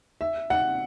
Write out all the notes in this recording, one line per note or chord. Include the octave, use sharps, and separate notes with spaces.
E5
F#5